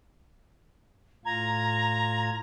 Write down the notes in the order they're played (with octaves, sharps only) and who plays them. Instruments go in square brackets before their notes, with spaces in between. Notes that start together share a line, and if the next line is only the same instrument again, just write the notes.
[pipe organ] A2 F4 G#6 [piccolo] A#5